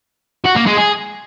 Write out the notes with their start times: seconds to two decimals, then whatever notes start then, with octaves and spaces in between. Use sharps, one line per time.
0.45 F#4
0.55 A#3
0.66 G#3
0.77 G#4